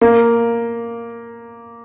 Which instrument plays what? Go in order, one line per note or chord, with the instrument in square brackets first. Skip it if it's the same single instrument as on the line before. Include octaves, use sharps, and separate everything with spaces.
[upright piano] A#3